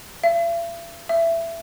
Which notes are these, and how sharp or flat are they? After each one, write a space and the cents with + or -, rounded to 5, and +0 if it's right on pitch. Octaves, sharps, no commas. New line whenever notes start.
E5 +45
E5 +15